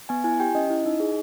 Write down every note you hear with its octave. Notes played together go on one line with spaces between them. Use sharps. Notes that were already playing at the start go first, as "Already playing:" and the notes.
B3 G#5
E4 G#5
G4 G5
C#4 D#5
E4
D#4
G#4